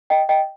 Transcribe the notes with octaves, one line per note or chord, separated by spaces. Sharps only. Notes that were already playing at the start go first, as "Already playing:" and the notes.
D#5 G5
D#5 G5